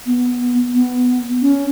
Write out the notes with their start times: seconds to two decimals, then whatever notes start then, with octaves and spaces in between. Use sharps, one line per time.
0.06 B3
0.74 B3
1.41 C#4